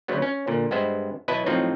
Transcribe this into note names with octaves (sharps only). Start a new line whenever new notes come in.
D2 C#3 F#3 B3
C#4
A#2 D3
G2 G#3 B3 C5 E5
B2 F#3 E4 B4 D#5 A5
A2 F3 F#3 C4 D#4